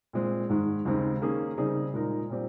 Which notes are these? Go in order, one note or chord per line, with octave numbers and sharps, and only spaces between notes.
A#2 G#3 C4
G#2 D#3 G#3
D#2 C#3 G#3 C4 D#4
D#3 A#3 C#4 G#4
C#3 G3 C4 D#4 G#4
A#2 G#3 D#4 A#4
A#2 G3 C4 G4